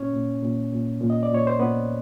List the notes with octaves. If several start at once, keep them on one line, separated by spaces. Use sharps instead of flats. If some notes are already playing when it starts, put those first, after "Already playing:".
Already playing: A#2 C#4 C#5
A#2
A#2
A#2
A#2
D#5
D5
A#2 C#5
C5
A#2 B3 B4